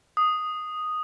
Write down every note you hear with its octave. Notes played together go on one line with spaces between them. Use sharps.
D#6